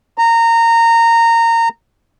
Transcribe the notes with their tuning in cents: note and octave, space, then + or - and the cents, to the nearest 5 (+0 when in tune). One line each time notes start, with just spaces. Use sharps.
A#5 -20